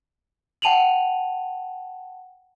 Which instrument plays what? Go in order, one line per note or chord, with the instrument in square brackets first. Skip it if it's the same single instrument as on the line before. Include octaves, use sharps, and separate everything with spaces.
[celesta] F#5 G5 A5 D#7 F7 F#7